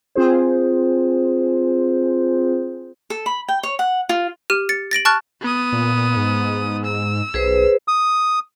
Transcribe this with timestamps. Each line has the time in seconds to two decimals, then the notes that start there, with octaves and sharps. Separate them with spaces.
0.15 C4 F4 G#4 C5
3.10 A4
3.26 B5
3.48 G5
3.63 C#5
3.79 F#5
4.09 F4
4.50 G4 F6 D#7
4.69 A6 C#7
4.91 A6 A#6 D7 F#7
5.05 A5 C#6 F6 F#6 A6
5.41 B3 D#6
5.72 A#2
6.16 G#2
6.85 E6
7.34 B1 G#4 B4 C5
7.88 D#6